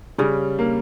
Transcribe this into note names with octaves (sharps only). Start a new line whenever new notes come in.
C#3 G3
A#3